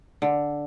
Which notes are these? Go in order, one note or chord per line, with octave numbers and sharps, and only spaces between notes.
D3